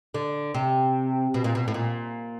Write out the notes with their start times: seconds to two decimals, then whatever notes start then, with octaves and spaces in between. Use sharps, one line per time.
0.14 D3
0.54 C3
1.34 B2
1.44 A#2
1.55 B2
1.68 A2
1.74 A#2